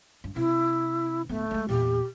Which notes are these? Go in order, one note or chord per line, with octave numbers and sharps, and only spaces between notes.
G2
C3 E4
D1 A3 B3
G#3 A#3
E2 A#2 G4